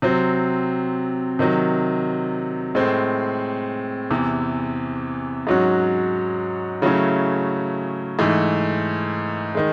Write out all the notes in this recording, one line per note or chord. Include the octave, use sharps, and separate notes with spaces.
C3 F#3 C4
C3 D#3 F#3
A2 G#3 C4
E2 C3 E3
G#2 F#3 C#4 F#4
C#3 F#3 A3 C#4 E4
G#2 E3 A3
D#3 G#3